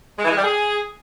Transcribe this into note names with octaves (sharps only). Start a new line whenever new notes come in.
G#3
E3
G#3
G3
G#4